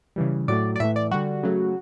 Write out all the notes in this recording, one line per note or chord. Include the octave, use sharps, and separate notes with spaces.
C#3 E3 G3
A2 F#3 A3 D5
D5
A2 E3 A3 E5
D5
D3 G3 F#4
C#3 F#3 A3